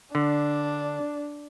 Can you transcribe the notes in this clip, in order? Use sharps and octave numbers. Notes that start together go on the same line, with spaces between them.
D3 D4